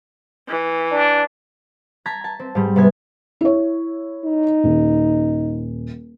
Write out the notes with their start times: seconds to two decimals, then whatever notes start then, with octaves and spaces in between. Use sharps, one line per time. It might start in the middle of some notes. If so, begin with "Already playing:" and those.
0.48 E3
0.92 D4
2.06 A5 A#5 G#6 B6
2.24 A5
2.39 C4
2.55 G#2 G3
2.76 C3 B3 G#5
3.41 E4 C#5
4.25 D#4
4.64 D#1